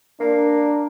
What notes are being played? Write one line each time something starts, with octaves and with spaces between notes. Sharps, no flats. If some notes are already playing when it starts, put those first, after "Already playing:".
A#3 D4